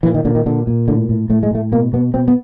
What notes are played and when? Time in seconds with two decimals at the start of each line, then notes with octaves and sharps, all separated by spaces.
0.03 A#2 E3
0.14 D#3
0.25 A#2 D3
0.35 D#3
0.46 A#2 D3
0.67 A#2
0.88 A2 D3
1.09 A2
1.30 A2 A3
1.43 G#3
1.51 A2 A3
1.72 B2 A#3
1.93 B2 B3
2.14 B2 C4
2.28 B3